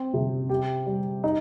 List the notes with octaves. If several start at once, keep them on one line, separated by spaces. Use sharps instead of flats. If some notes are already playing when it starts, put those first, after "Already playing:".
Already playing: C4
C3
G4
G3
D#4